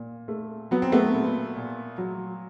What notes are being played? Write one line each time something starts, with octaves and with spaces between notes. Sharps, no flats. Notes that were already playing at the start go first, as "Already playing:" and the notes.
Already playing: A#2
A3
F#3 B3
C4
A3 B3
A#2
A#2
F#3